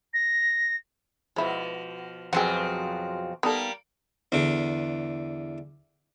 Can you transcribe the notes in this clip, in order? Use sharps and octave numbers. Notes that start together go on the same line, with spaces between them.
A#6
B2 F3 G#3 E4
F2 B2 F3 F#3 C4 G#4 F#5 G5
G3 A#3 B3 D#4 A4
E2 D3